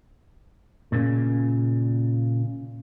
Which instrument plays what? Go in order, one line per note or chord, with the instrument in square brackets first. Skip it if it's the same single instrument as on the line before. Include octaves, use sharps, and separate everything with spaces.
[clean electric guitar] A#2 C#3